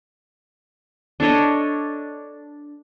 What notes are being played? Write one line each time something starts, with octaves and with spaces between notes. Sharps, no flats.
D4 A4 C#5 D#5